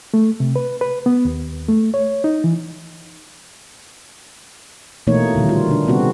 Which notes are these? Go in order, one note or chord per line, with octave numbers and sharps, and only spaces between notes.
A3
C3
B4
B4
B3
D#2
A3
C#5
D#4
E3
B2 E3 A3 A#3 D#4 C#5
A#2 D3 D#3 G3
F4
D3 D4
C3 G3 B3 C4 F#4